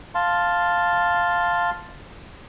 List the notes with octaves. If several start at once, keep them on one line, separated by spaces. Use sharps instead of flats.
F5 A5 C6